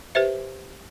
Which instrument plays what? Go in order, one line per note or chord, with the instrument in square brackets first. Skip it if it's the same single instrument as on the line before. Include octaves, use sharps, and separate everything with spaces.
[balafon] G4 B4 C5 E5